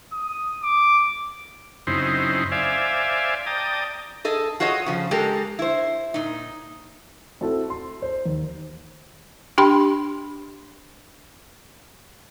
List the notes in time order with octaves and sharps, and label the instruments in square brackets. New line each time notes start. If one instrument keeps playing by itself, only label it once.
[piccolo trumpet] D#6
D6
[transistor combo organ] F#2 C#3 C4 D#4 E4 C5
C5 D5 E5 F5 G#5
D5 G5 A5 A#5 D#6
[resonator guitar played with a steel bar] G#4 A4 D#5
F4 F#4 G#4 C#5 D#5
C#3 F3
G#3 G4 A4 A#4
E4 C5
A#2 D#4
[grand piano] C4 E4 F#4 A4
C6
C5
D#2
[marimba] D4 G4 G5 B5 C6